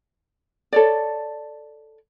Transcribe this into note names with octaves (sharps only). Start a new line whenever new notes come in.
A4 C#5 D5